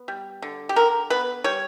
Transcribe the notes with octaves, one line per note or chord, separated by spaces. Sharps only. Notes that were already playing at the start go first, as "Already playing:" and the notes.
Already playing: B3
G3
D3
G4
D3 A#4
B3 B4
G3 C#5